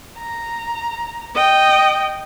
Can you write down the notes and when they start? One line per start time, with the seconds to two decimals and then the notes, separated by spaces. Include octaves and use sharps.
0.19 A#5
1.35 D#5 G5